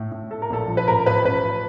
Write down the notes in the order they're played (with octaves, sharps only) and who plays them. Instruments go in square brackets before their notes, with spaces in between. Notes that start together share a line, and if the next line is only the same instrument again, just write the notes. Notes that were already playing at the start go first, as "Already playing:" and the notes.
Already playing: [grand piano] A2 A3
A2
[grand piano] A3 [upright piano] A4
[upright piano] A#4
[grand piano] A#1 [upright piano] A4
[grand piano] F3
[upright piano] B4
[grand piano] A1 [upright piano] A#4
[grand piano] A1 [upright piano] B4
[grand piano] A1 [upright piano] B4